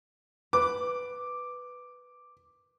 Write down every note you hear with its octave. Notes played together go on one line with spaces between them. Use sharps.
B4 D6